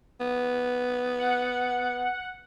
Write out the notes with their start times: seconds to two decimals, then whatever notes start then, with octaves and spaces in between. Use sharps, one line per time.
0.21 B3
1.19 F#5